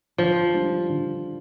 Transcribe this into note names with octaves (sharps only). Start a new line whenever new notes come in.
D3 F3
G3 D4
D3